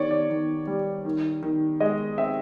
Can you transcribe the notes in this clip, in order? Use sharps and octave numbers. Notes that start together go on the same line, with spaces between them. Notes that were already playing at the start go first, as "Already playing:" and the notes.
Already playing: D#3 C#5 D5
D5
D#3
G3
D#3
D#3
G#3 D#5
C4 E5